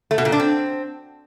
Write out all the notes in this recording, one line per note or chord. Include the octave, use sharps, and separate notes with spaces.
A3
B2
A#2
D4
C4